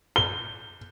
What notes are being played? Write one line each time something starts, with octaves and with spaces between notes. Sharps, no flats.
G7